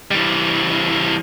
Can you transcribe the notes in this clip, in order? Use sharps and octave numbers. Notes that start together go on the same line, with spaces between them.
E3 G3